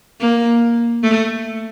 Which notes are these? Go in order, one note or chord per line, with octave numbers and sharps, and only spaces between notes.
A#3
A3